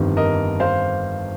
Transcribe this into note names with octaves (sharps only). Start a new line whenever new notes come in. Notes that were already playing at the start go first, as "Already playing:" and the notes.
Already playing: G1 F2 D#3 G3
A#4 D#5
C5 F5